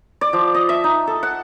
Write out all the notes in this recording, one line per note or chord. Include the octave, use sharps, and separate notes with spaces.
D5
F3
D#5
E5
D#4
A4
F#5